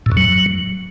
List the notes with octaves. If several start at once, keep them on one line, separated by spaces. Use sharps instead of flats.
A2
F#2
F#3